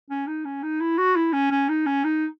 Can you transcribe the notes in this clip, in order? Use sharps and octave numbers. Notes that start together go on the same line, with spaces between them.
C#4
D#4
C#4
D#4
E4
F#4
E4
C#4
C#4
D#4
C#4
D#4